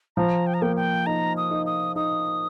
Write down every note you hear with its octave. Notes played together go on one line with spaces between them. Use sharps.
F3 A#5
G5
A#5
A#3 G5
G5
D#4 A#5
D#6
D#4
D#6
D#4 D#6